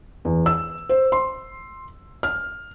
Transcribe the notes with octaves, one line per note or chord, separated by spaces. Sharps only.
E2
E6
C5
C6
F6